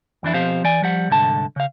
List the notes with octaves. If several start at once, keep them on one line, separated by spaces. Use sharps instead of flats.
F2 E3 D4 E4
B2 F3 C4 G4 C5 F5
E3 D5 G#5
F3 G3 F#5
C2 G#2 D3 A5
C#3 F5